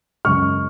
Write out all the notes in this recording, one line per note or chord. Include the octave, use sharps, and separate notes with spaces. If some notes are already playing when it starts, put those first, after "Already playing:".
F#2 C#3 G#3 C#6 F6